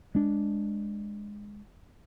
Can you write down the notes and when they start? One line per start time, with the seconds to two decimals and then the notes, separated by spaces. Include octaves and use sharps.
0.15 G#3 D4